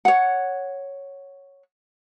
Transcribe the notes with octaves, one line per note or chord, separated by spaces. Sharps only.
C#5 F#5